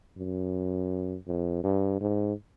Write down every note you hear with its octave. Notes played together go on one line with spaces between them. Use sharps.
F#2
F2
G2
G#2